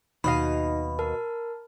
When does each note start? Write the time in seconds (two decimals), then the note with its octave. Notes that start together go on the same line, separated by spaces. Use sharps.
0.24 D#2 B2 D#4 D#5 F5 B5 A#6
0.99 A#4 A5 F6